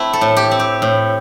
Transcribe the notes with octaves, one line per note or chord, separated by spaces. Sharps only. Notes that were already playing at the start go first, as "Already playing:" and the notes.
Already playing: A3 C4 E4
A4
A2
G4
C4
G4
A2